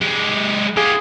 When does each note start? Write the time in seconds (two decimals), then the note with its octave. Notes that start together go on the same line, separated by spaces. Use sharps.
0.01 G#3 G4
0.77 F4 G4 G#4